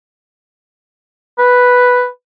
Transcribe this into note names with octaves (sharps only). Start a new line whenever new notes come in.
B4